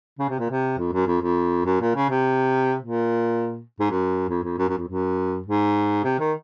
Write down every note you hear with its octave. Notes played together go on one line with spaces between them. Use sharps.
C#3
C3
A#2
C3
F2
F#2
F2
F2
F#2
A#2
C#3
C3
A#2
G#2
F#2
F2
F2
F#2
F#2
F2
F#2
G#2
C3
D#3